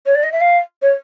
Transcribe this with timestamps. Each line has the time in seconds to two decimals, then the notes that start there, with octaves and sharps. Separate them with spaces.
0.06 C#5
0.15 D5
0.23 D#5
0.32 E5
0.41 F5
0.82 C#5